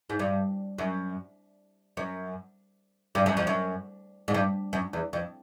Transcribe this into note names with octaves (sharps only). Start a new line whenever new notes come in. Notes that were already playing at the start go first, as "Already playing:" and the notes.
G#2
G2
F#2
F#2
G2
F#2
F2
F#2
G#2
G2
F#2
E2
F2